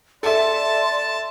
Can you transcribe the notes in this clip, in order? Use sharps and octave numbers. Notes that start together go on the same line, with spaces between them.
A4 D5 E5 A5 C6